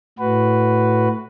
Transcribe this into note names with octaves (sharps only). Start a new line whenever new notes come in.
A2 F#4 B4